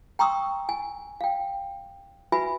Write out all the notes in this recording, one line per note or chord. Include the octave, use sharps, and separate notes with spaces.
G5 A#5 C6 C#6 D#6 E6
G#5
F5 G5
F#4 B4 E5 G#5 B5